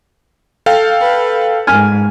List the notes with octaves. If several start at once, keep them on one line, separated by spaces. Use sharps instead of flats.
A4 F5 G5
B4
G#2 G#5 F6